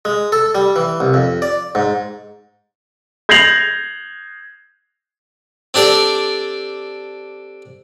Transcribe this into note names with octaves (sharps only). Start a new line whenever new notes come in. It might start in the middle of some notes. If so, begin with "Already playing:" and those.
G#3
A4
G3
E3
C2
F2
D5
G#2
G6 G#6 A#6 C7 F7 F#7
C4 D4 G4 A4 D5